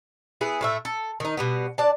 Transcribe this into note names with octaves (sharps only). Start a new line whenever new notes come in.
B3 E4 G#4
A2 A3 E5
A4
D#3 D#4
B2 G3 B3
D4 D5 A5